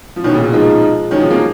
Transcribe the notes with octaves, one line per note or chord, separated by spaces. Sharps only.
F3
B2 D#3 C#4
A#2 C#3
B2
F3 G#3 D#4
D#3 F#3 C#4
F3 G#3
F#3 A#3